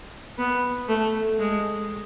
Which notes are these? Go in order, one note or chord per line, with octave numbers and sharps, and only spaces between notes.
B3
A3
G#3